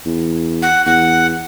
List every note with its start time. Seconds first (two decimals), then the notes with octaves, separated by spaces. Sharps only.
0.06 E2
0.62 F#5
0.86 E2 F#5